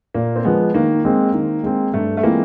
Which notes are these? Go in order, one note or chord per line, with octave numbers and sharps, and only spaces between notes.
A#2 A#3
C4
F3 G#3 B3
D#3 A#3
G#3 C4
D#3
G#3 C4
G2 A3
A3
E3 G#3 A#3 C4 F4